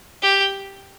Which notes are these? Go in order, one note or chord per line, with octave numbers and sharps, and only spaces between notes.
G4